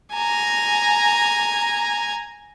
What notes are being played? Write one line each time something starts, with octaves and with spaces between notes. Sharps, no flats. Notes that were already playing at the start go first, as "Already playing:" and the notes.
G#5 A#5